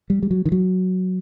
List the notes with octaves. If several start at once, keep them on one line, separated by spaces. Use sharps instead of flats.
G3
G3
F#3
D#3
F#3